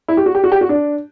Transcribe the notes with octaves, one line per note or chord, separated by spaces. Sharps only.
E4
G4
F#4
G4
F#4
G4
F#4
D4